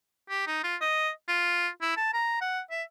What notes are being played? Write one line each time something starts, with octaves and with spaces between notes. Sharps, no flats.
G4
D#4
F4
D#5
F4
E4
A5
A#5
F#5
E5